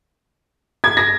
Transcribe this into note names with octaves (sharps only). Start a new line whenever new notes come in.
G#6
A#6